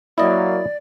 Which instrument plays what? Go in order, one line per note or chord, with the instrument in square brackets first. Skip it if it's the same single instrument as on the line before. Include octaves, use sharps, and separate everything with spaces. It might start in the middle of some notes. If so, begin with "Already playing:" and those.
[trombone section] F#3 A#3 [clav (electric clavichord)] E4 D#5 [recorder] D5